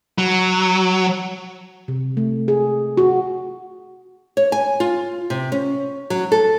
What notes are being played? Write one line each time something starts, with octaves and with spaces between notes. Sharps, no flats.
F#3
C3
A3
G#4
F#4
C#5
G#5
F4
C3
C#4
F#3
A4